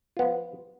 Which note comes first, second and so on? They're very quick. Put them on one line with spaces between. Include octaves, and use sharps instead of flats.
F4 B3 F3